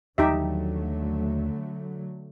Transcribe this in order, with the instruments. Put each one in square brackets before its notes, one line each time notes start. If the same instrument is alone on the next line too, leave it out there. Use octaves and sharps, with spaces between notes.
[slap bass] D#2 F3 [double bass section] D3 F#3 A3 [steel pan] D#4 G4 E5